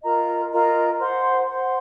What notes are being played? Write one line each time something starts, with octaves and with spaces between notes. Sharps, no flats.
F4 A#4 D#5 A#5
F4 A#4 D#5 A#5
C5 F#5 C6
C5 F#5 C6